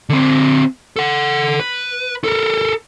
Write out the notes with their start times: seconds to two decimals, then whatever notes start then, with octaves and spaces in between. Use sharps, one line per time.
0.09 D3 C4
0.96 A4 F#5
1.60 B4
2.24 A4 A#4